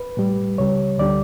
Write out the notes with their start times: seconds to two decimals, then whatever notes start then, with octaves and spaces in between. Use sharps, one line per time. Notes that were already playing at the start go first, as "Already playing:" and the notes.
Already playing: B4
0.17 A2 G3
0.58 C#2 C#3 G3 C#5
0.98 D2 D3 G3 D5